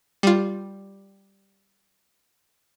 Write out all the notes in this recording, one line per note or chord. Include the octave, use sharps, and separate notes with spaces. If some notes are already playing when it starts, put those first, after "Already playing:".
G3 F4